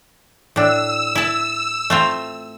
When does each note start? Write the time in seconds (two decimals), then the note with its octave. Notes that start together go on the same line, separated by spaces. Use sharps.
0.56 A2 D4 E6
1.15 E4 A5
1.90 A3 C4 F4